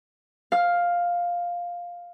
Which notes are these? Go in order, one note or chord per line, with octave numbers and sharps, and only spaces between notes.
F5 F6